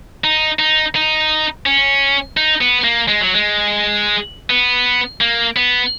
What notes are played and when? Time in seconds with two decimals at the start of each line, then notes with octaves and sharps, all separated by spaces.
0.24 D#4
0.59 D#4
0.95 D#4
1.66 C#4
2.37 D#4
2.61 B3
2.84 A#3
3.08 G#3
3.21 F#3
3.34 G#3
4.50 B3
5.21 A#3
5.56 B3